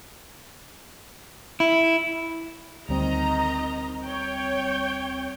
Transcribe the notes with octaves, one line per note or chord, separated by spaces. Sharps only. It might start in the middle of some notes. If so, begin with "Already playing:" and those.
E4
D2 D#3 G3 C4 D#5 A#5
C#5 G5